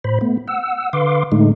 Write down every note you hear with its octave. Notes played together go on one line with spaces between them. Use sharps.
A2 C5 B5
A3 B3
F#5 E6
D3 B4 F5 C6 D6
A2 D3 G#3 A3 D#4